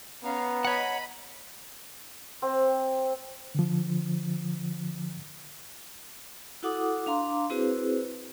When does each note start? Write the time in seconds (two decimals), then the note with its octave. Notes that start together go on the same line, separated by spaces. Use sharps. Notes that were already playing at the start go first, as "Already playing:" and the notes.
0.23 B3 C#4 F5 A#5
0.65 C#5 D#5 F#5 B5
2.42 C4
3.55 D3 F3
6.63 E4 F#4 A4 F#5 D6 D#6
7.06 D4 F5 A#5 C6 D6
7.50 C4 E4 F#4 G#4 B4 C5